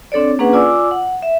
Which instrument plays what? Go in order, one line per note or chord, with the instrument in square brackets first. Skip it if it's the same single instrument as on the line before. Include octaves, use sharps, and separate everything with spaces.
[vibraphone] C4 D4 A4 C#5 D5
A#3 C#4 D4 G#4 B4 F#5
F4 D5 G#5 D6 E6
F#5
E5